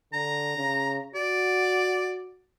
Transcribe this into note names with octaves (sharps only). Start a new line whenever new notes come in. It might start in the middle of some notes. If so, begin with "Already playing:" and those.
D3 A#5
C#3
F#4 D5